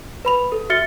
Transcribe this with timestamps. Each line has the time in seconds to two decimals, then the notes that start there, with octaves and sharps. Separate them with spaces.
0.25 B4 B5 F7
0.52 A4
0.69 F#4 E5 F6 A6 C#7 G7